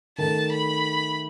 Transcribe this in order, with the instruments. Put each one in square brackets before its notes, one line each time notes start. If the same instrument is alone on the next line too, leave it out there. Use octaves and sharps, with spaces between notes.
[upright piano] D#3 A3 D#4 [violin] A5
[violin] B5